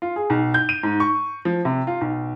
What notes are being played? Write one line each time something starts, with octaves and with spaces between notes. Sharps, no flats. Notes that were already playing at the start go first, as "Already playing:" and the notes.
F4
G#4
B1
G6
D#7
G#2
C#6
F3
C3
F4
B1